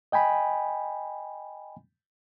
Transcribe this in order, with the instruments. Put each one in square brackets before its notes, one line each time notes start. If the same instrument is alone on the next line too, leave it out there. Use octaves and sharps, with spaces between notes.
[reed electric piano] D#5 G5 G#5 B5